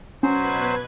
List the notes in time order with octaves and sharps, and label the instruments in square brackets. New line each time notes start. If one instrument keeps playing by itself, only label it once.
[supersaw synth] B2 B4 G#6 [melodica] F#3 C5 [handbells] C#4